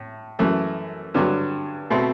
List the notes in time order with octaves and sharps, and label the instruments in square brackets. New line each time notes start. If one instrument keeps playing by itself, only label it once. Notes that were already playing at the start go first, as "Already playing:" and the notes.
Already playing: [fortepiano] A2
F#2 E3 A3
G2 D3 F#3
B2 A3 C4